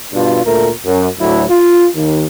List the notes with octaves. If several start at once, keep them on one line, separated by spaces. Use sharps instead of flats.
G2 B2 D4 F4
D2 A#2 A3 A#4
F#2
D2 A2 F#3 E4
F4
D#2